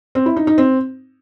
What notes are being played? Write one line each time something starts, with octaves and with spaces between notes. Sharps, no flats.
C4
E4
D#4
D#4
C4